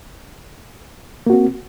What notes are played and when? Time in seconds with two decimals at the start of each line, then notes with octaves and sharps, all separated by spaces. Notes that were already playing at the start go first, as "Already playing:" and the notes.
1.26 A#3
1.30 F#4
1.33 C4